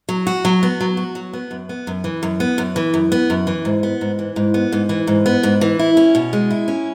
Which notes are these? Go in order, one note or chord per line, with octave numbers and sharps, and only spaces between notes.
F#3
F#4
F#3
B3
F#3
F#4
F#3
B3
F#2
B3
F#2
E3
F#2
B3
F#2
E3
F#2
B3
F#2
E3
G#2
B3
G#2
E3
G#2
B3
G#2
E3
G#2
B3
G#2
E3
E4
C#4
B2
G#3
E4
C#4